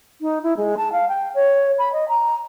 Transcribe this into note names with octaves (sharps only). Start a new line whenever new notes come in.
D#4
E4
G#3
A5
F5
G5
C#5
B5
D#5
A#5